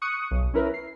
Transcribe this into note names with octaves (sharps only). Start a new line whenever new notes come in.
C#6 D#6 F#6 C#7 D#7
B1
C#4 E4 A#4 B4
C7